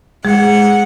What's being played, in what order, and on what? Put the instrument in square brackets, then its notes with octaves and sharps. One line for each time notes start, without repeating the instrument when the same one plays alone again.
[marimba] G#3 [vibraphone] G#4 [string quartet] F#5